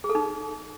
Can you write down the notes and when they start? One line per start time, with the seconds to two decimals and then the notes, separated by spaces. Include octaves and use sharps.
0.04 G#4
0.09 A4
0.15 D#4